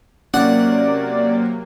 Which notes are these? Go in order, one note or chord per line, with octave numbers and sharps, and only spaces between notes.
C3 F#3 A#3 C#4 D5 F#5